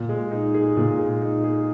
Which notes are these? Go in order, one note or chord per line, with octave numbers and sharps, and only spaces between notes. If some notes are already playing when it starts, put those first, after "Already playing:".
Already playing: A#2
G#3
D#4
G#4
A#2
G#3
D#4
G#4